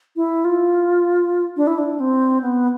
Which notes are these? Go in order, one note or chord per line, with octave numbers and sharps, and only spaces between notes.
E4
F4
D4
E4
D4
C4
B3